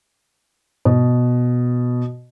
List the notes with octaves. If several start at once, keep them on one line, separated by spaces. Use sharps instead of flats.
B2